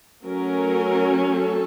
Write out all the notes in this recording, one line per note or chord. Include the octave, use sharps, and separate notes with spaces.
F#3 A3 C#4 A#4
A4